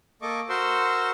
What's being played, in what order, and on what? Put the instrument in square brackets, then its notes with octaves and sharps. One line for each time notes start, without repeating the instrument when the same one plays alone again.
[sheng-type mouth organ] A#3 A4 D#5 C#6 D6
F#4 A#4 C5 C6 C#6 E6